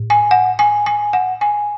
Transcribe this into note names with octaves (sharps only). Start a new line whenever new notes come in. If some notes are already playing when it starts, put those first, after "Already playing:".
Already playing: A2
G#5
F#5
G#5
G#5
F#5
G#5